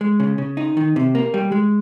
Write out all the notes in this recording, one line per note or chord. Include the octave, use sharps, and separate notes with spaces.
G#3
C#3
C#3
D#4
D#3
C3
A#3
G3
G#3